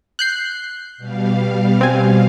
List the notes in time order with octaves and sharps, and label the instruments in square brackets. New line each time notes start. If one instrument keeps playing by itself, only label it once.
[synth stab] F#6 G6 C7
[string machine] B2 G3 F5
[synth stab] C4 G#5